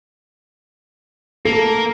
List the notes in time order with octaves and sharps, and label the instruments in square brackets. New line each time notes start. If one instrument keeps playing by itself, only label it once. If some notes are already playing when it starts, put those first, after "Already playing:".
[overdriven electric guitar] A#3 [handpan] A4